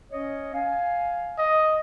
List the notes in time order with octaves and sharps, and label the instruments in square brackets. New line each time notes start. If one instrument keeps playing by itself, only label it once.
[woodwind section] C#4 C#5 D#5
F5 G#5
[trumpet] D#5